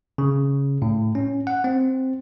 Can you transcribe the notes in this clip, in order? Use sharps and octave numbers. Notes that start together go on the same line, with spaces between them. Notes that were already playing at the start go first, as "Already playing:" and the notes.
C#3
A2
C#4
F#5
C4